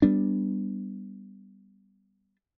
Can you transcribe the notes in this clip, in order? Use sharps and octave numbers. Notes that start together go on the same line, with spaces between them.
G3 B3 D4